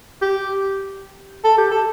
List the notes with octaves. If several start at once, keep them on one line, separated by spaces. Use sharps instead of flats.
G4
A4
G4
A4